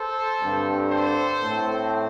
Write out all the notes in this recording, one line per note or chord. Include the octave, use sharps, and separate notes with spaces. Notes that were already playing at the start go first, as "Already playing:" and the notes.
Already playing: A4 C5
G2 D3 G3 C4
A4 C5
A2 A3 C4